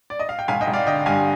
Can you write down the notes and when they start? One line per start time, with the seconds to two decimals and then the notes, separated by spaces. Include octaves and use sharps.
0.10 D5
0.20 D#5
0.29 F5
0.39 G5
0.48 G#1 F5 G#5
0.61 D#5 G5
0.67 G#1
0.73 D5 F5
0.87 D3 D#5 G5
1.06 G2 F5 G#5